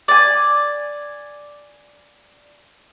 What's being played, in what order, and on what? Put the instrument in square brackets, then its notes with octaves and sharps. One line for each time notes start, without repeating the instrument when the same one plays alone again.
[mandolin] D5 G#5